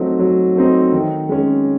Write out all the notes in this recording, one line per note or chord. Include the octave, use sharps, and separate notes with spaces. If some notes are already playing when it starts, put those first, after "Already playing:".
Already playing: F#3 A3 C4 D#4
F#3
A3 C4 D#4
D#3
G#3 C#4